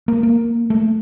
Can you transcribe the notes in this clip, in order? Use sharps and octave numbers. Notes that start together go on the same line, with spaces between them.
A#3
A#3
A3